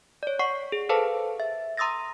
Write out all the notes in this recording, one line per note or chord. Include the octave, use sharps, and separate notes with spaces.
C#5 D5
D5 F#5 C#6 C7
G#4
A4 B4 C5 F5 A5
E5
A#5 C6 D#6 E6 A6 A#6